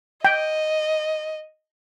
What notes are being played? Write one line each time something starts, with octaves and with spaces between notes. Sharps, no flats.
D#5 G5